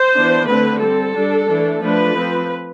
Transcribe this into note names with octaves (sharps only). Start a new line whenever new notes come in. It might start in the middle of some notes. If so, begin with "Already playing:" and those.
Already playing: C5
E3 B3 D4
D3 A3 C4 B4
G3 C4 A4
G3 D4
E3 A3 D4
F3 A3 D4 B4
F3 C4